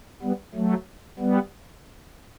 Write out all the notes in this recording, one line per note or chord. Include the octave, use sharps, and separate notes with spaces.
G3 B3
F#3 A3
G3 B3